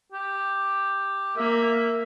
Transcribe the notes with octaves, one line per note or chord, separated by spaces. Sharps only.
G4
A#3 E5